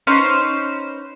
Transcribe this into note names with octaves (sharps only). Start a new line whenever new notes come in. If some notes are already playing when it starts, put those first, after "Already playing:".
C#4 D#4 B4 C5